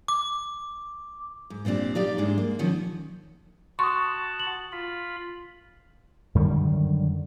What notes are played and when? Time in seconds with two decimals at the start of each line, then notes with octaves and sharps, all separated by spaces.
0.08 D6
1.50 G#2
1.65 A#2 B3 C4 D4 G4
1.95 D#4 G4 D5 F5
2.18 G#2 G#3 D4 E4
2.38 A#3
2.59 B2 D#3 F3 C#4
3.79 F#4 F#5 A5 C6 C#6 D#6
4.40 F#7
4.72 F4 B5
6.35 F#2 D3 D#3 G3